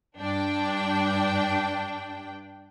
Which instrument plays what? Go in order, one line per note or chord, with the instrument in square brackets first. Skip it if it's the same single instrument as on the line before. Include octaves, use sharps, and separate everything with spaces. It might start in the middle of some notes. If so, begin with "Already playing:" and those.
[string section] G2 D4 G5